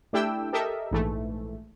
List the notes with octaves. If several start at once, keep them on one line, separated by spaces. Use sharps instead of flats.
A3 D4 E4 G4 G5 E6
G4 A4 A#4 D#5 E5
A#1 G#2 E3 A3